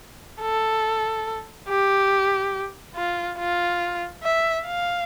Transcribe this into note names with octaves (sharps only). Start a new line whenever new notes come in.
A4
G4
F4
F4
E5
F5